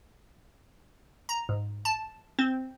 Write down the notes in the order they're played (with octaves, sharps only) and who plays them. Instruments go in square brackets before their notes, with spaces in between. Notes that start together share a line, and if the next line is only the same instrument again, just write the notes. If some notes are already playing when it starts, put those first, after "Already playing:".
[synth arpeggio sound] A#5
G#2
A5
C4